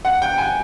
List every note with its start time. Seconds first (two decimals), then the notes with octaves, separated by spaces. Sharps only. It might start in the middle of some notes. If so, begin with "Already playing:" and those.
0.05 F#5
0.22 G5
0.38 G#5